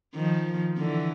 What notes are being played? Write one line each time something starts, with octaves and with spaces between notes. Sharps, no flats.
D#3 F3
D3 E3